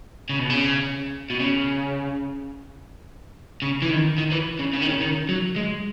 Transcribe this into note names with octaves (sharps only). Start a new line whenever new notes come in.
C#3
B2
C#3
B2
C#3
C#3
E3
D#3
D#3
E3
C#3
C#3
D#3
C#3
D#3
F#3
G#3